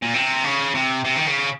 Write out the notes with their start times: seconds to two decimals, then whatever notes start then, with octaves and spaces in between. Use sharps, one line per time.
0.02 A#2
0.14 C3
0.44 C#3
0.74 C3
1.05 C3
1.16 D#3
1.27 C#3